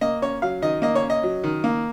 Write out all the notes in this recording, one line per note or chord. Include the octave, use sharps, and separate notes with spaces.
A#3 D#5
C#4 C#5
F#3 F5
D#3 D#5
A#3 D#5
C#5
C#4
D#5
F#3
D#3
A#3